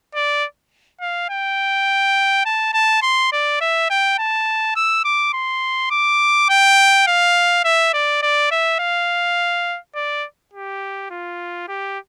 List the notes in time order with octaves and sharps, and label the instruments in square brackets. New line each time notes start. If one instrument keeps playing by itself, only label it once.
[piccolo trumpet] D5
F5
G5
A5
A5
C6
D5
E5
G5
A5
E6
D6
C6
D6
G5
F5
E5
D5
D5
E5
F5
D5
G4
F4
G4